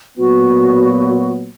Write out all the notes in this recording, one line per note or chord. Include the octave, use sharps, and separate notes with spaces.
A#2 F#3 B3 F#4